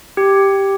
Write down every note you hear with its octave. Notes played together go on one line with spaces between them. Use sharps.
G4